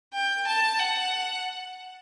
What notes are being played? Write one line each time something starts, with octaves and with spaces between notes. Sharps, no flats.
G5
A5
F#5